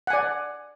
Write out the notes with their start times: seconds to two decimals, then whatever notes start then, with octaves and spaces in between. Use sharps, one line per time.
0.07 F#5
0.10 G#5
0.13 D5